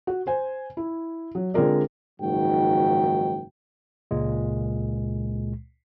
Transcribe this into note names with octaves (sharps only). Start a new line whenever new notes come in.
F#4
C5 G#5
E4
F#3
D3 G#3 C4 F4 A#4 D5
F#1 G#2 D#3 F3 F#4 G5
C#2 A#2 G#3